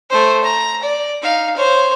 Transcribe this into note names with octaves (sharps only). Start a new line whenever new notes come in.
A3 C5
A#5
D5
D#4 F5
C5 C#5